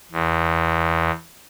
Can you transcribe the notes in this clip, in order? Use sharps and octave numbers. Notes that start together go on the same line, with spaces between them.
E2